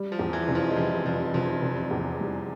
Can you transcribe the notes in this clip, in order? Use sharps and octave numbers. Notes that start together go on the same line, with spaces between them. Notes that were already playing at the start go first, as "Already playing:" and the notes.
Already playing: G3
F3
E2
E3
F1
F3
G#3
F1 G3
F1 F3
F1 F3
F1
E2
G3